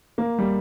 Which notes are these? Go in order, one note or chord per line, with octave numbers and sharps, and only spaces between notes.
A#3
G3